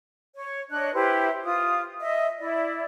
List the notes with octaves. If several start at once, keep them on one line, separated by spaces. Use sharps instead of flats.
C#5
D4 C#5 D#5 F#6
E4 G4 B4 C5
F4 D#6
D#5 E5
E4 D5